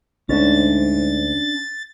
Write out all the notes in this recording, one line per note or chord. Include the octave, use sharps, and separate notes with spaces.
D2 G#2 C#4 D4 A6